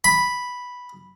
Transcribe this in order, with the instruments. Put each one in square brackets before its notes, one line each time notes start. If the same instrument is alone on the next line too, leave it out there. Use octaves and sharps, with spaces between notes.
[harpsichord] B5